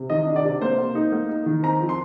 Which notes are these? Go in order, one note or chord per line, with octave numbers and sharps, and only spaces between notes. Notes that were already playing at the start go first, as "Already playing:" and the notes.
Already playing: C3
D#3 D#5
D4
D5
C3
A#3 C5
A#3
D#4
A#3
D#4
D#3
C4 A#5
F3
C6